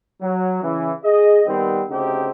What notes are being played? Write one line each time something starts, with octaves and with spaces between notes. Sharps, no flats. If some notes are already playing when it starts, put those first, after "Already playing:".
F#3
C#3 E3
G#4 D#5
D#3 G3 B3 C4
D2 C#3 C4 D#4 G4